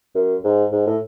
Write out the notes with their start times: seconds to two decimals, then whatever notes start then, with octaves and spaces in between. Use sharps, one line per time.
0.15 F#2
0.44 G#2
0.72 G#2
0.86 A2